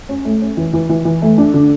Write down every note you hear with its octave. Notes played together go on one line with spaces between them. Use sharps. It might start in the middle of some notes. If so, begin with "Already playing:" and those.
C#4
A3
C#4
E3
E3
E3
E3
A3
D4
D3